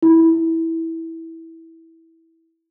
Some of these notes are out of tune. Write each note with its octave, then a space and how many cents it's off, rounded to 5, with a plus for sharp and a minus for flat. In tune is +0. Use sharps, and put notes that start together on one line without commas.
E4 -10